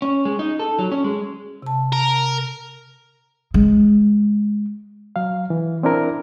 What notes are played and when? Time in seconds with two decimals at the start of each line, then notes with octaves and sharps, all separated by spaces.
0.02 C#4
0.25 G#3
0.39 D#4
0.59 A4
0.79 F#3
0.92 C#4
1.04 G#3
1.62 C3 A5
1.93 A#4
3.54 G#3
5.16 F#3 F5
5.50 E3
5.83 C4 D4 E4 A#4